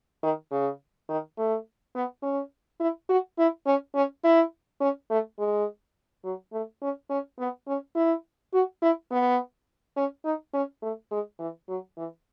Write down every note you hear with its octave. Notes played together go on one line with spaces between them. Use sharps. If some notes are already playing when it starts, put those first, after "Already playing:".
D#3
C#3
D#3
A3
B3
C#4
E4
F#4
E4
C#4
C#4
E4
C#4
A3
G#3
F#3
A3
C#4
C#4
B3
C#4
E4
F#4
E4
B3
C#4
D#4
C#4
A3
G#3
E3
F#3
E3